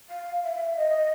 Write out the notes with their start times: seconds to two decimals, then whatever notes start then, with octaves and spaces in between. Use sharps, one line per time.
0.10 F5
0.44 E5
0.77 D#5